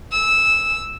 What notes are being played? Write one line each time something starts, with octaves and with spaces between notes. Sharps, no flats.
E6